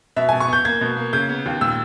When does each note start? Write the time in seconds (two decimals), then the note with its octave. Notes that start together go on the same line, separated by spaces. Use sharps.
0.16 B2 E5
0.29 B2 G#5
0.40 C#6
0.48 B3 G6
0.65 A#3 G#6
0.81 B2
0.97 A#3
1.13 C#3 G6
1.29 B3
1.46 D#2
1.61 A#2 E6